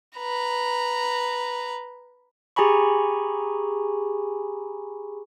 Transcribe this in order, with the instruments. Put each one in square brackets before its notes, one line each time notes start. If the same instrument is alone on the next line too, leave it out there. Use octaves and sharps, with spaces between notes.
[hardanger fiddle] B4 A#5
[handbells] G4 G#4 G#5 A#5 B5 C#6